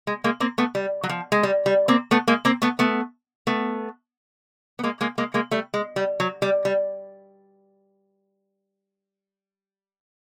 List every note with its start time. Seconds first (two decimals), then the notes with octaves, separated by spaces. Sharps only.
0.07 G#3
0.24 G#3 A#3
0.40 A#3 C4
0.58 A3 B3
0.75 G3
1.03 F#3
1.09 F3
1.32 G#3
1.43 G3
1.66 G3
1.88 A#3 C4
2.11 A3 B3
2.28 G#3 A#3
2.45 A#3 C4
2.62 A3 B3
2.79 A3 B3
3.47 A3 B3
4.79 B3
4.83 G#3 A#3
5.01 G#3 A#3
5.18 G#3 A#3
5.34 G#3 A#3
5.51 G3 A3
5.74 G#3
5.96 G3
6.20 F#3
6.42 G3
6.65 G3